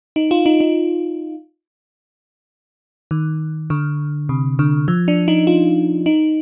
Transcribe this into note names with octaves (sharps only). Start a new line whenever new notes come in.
D#4
F4
D#4
D#4
D#3
D3
C3
D3
F3
D4
D#4
F4
D#4